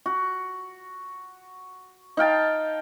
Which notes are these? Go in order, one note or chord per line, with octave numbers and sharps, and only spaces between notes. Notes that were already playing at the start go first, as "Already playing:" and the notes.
F#4
D#4 F5 G5 A5